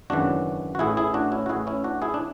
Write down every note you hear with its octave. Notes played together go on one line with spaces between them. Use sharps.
G#1 F#2 C#3 E3 D4 F#4
F#4
A1 A2 E3 E4 G#4
E4 G#4
D4 F#4
C#4 E4
F#4
A1 A2 E3 E4 G#4
C#4 E4
D4 F#4
E4 G#4
D4